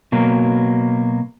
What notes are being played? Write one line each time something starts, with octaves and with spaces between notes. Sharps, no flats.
B2 F#3 A#3